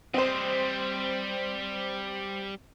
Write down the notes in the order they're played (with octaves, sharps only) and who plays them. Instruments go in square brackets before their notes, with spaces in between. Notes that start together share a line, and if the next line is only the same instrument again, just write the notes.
[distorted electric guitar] G3 D#5 [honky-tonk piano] C4 C5